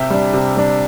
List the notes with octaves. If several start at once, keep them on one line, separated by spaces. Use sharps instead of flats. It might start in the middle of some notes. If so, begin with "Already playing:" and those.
Already playing: C3 E5 G5
G3 D4
C3
G3 D4